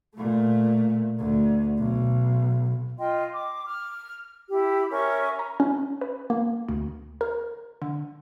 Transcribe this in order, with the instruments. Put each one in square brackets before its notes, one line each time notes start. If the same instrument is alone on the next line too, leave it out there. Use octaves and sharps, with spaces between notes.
[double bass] A#2 A3
D2
B1
[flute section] F4 D#5 G5 C6
D6
F6
E4 G4
C#4 A#4 E5 C#6
[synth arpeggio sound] A#5
C#4
B4
A#3
D2
A#4
D3